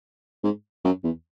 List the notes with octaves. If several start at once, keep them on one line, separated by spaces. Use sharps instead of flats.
G#2
F#2
E2